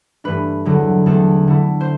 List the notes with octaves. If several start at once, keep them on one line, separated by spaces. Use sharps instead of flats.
G2 E3 A3 D4 B4
E2 D3 F#3
E2 D3 A3 C4 A4
D3 A3 E4
C5